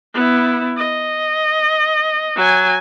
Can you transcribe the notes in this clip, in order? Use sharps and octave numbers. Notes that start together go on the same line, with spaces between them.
B3 E4
D#5
F#3 G#5